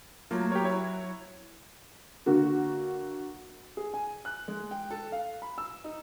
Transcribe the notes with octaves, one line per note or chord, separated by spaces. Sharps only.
F#3 A3 A#3 F4
G4 A#4 C#5
E4 C#5
D3 A#3 F#4
G#4
G#5
F#6
G#3
G5
A4
F5
B5
E6
D#4